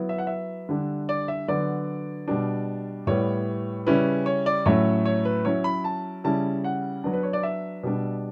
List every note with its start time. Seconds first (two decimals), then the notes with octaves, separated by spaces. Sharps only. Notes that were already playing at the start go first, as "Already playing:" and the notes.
Already playing: F#3 B3 E4
0.09 E5
0.18 F#5
0.27 E5
0.69 D3 G3 D4
1.09 D5
1.28 E5
1.48 D3 F#3 B3 D5
2.28 B2 G3 D4
3.07 A2 G3 B3 C#5
3.87 C#3 G3 C#4 E4 B4
4.26 C#5
4.46 D5
4.66 A2 F#3 A3 C#4 C#5
5.05 C#5
5.25 B4
5.45 F#3 C#4 E4 C#5
5.64 B5
5.84 A5
6.24 C#3 G3 C#4 E4 A5
6.64 F#5
7.04 F#3 B3 D4
7.13 B4
7.23 C#5
7.33 D5
7.43 E5
7.83 B2 G3 D4